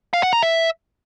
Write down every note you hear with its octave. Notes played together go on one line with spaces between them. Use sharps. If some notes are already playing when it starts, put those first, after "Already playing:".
F5
F#5
A#5
E5